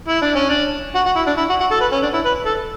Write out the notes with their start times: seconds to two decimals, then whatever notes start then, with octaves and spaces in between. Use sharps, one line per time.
0.08 E4
0.22 D4
0.35 C#4
0.49 D4
0.95 F#4
1.06 F#4
1.16 E4
1.27 D4
1.37 E4
1.49 F#4
1.60 F#4
1.71 A4
1.81 B4
1.92 C#4
2.03 D4
2.13 E4
2.25 B4
2.46 A4